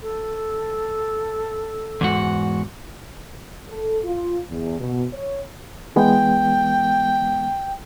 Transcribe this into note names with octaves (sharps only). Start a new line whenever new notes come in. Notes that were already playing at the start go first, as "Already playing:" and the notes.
A4
E2 G#2 F#4
A4
F4
E2
B2
C#5
E3 G#3 B3 G5